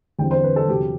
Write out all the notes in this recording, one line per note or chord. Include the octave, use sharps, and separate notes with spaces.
E2 D3 G3 C4 G5
C5
B4
A4
E2 C3 F#3 G4